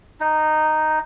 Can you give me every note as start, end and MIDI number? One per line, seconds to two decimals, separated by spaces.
0.20 0.99 63